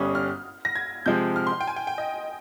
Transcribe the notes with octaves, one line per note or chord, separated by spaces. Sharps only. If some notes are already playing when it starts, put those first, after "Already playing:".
Already playing: G1 G2 G3 C#4 D#6
F6
A#6
G#6
C3 F3 G#3 G6
F6
C6
G5
G#5
G5
G5
D#5